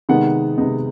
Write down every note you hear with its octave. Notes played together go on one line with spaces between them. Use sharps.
C3 D#3 G#3 B3 D#4 F#5
C3 D#3 G#3 B3 D#4